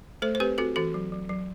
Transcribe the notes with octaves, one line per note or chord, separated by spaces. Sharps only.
A3 A4 C5
C5
C4 G4 B4
C4 F#4 A4
E3 F#4 A4
F#3
F#3
F#3